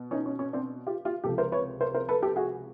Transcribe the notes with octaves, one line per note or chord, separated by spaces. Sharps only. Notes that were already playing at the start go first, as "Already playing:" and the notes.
Already playing: B2
C#4 D#4
C#4
C#4
C4 D4
F4 G4
F4 G4
C#2 C3 F3 G4 A4
A#4 C5
B4 C#5
A#4 C5
A#4 C5
A4 B4
G4 A4
F#4 G#4